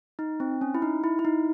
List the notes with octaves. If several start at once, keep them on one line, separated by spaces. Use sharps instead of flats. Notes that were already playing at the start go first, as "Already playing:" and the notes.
D#4
C4
C#4
E4
D#4
E4
E4
D#4